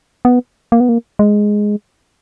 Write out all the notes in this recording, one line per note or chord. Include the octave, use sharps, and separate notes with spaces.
B3
A#3
B3
A#3
G#3